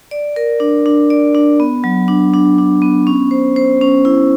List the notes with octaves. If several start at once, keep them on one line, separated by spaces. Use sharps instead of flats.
D5
A#4
D4
D4
D5
D4
B3
F#3
D4
D4
D4
B3
C#4
C5
C5
C#4
E4